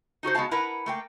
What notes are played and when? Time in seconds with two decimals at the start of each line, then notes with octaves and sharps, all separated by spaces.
0.23 D#4 F#4 A4 C5
0.35 G#3 B3 C4 F#4 F5 A5
0.51 E4 A#4 B4 F#5 A#5
0.86 A3 A#3 G5